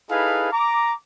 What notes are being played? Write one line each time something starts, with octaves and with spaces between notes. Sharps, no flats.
D#4 E4 G#4 A4 B4 F5
A#5 D6